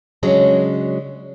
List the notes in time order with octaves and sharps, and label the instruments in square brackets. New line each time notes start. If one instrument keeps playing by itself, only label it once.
[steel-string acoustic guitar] C#3 F#3 G#3 C#4 D4